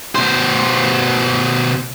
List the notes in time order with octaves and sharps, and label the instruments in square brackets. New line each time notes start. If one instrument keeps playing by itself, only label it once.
[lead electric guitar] B2 C5